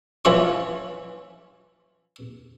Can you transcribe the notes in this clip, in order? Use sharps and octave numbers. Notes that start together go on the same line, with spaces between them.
E3 C#4 F4 E5 C6 C#6